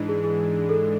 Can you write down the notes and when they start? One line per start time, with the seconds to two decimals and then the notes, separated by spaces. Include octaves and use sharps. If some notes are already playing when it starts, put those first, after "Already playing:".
Already playing: G#2 E3 G#3 D4
0.09 G#4
0.24 G#4
0.69 A4